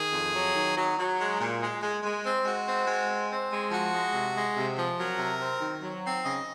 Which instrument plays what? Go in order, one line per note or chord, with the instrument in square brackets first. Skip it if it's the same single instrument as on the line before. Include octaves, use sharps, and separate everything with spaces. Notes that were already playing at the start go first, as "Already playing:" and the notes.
Already playing: [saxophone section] D#3 G#4
F2
F#3
D#3
F#3
F#3
G#3
A#2
G#3
G#3
G#3
C4
G#3 F#4
C4
G#3
C4
C4
G#3
F3 F#4
G#3
C3
G#3
C3
F3
F#3 A#4
C3
C4
D#3
F#3
C4
C#3 D#5